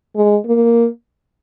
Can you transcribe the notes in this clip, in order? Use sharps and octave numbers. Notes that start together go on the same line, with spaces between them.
G#3
A#3